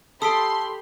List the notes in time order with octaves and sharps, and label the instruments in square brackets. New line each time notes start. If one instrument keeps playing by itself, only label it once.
[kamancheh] G4 B5 [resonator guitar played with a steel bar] A4 [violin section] C6 [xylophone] D#6 B6 D7